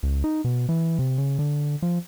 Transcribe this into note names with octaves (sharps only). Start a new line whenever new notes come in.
C#2
D#4
B2
E3
C3
C#3
D3
F3